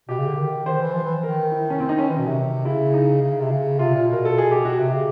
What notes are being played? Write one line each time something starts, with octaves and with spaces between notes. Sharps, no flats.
B2 G4
C#3
D3
D#3
D#3 C5
E3
F3
E3
D#3 A#4
E4
C#4
C4
D#4
C#4
E3
B2
C3
C#3 E4
D#4
C#3
C3
C#3
C3 F4
A#2
B2 A#4
A4
G#4
G4
B2 F#4
C3 G4
C#3